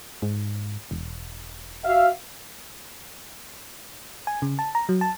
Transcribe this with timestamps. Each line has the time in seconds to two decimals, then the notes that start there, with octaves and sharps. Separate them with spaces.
0.22 G#2
0.91 E1
1.84 F#4 E5 F5
4.27 G#5
4.42 C#3
4.59 A5
4.75 A#5
4.89 F#3
5.01 A5